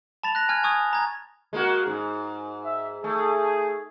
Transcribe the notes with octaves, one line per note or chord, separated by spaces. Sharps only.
A5 B5 A6 F7
F#6 A#6
G#5 F6 G#6
G#5 C#6 D#6 G#6
A#5 G#6
G#3 A#3 F#4
G#2
E5
A3 G#4